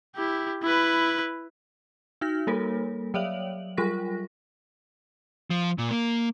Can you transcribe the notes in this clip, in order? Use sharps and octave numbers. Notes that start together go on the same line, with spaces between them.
E4 G4
E4 B4
D#4 F#4 F6 A#6
G3 A#3 A4 A#4 C#5
F#3 C#5 D5 E5 F5 F#7
F#3 G3 F4 A#4 C#6 A#6
F3
A#2
A#3